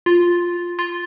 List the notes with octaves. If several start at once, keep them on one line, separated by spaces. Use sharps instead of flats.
F4
F4